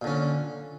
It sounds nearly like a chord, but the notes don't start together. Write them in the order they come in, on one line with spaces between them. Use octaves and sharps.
A#2 D3 C#4